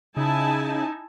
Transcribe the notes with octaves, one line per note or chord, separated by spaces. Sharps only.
C#3 D#4 E4 G#5 A5